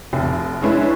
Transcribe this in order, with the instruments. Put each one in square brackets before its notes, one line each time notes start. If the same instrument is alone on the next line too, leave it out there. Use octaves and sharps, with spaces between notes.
[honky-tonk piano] F1
G#3 C#4 D4 E4 B4 C#5